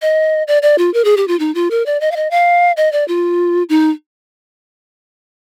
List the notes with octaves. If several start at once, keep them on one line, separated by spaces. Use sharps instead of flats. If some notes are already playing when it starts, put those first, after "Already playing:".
D#5
D5
D5
F4
A#4
G#4
G4
F4
D#4
F4
A#4
D5
D#5
F5
D#5
F5
D#5
D5
F4
D#4